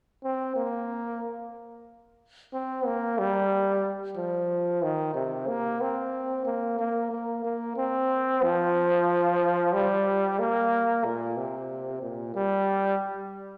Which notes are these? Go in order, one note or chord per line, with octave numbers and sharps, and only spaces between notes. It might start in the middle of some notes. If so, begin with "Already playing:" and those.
C4
A#3
C4
A#3
G3
F3
D#3
C3
A#3
C4
A#3
A#3
A#3
A#3
C4
F3
G3
A#3
A#2
C3
A#2
G3